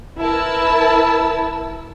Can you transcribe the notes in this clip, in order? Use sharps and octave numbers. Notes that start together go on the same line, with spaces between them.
E4 A#4 B4 A5 E6